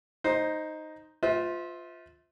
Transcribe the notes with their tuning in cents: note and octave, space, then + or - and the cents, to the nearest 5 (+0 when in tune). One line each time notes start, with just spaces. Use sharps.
D#4 +0 C5 +5
F4 +10 C5 -45 E5 -30